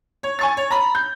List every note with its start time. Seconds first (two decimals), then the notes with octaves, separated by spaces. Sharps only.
0.23 C#5
0.39 G#5 C#6 A6
0.57 C#5
0.71 A#5 B5
0.95 G6